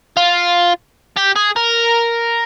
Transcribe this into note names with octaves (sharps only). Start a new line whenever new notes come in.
F4
G4
G#4
A#4